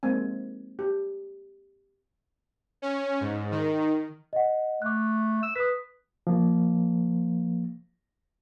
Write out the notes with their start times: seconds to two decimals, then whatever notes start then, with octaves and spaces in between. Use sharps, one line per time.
0.03 G#3 A#3 C4 G#5
0.79 G4
2.82 C#4
3.21 G#2
3.51 D#3
4.33 D#5 F#5
4.82 A3 D6 F#6
5.43 E6
5.56 B4 D#6 B6
6.27 F3 A#3